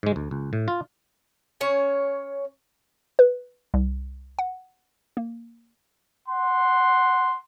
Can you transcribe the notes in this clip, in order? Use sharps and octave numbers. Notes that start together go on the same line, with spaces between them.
G#2 G#3
D2
C#2
A2
F4
C#4 C#5 G#5
B4
C2
F#5
A#3
F#5 C6